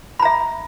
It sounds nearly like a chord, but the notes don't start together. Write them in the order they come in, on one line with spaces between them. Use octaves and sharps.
B5 A#5 E5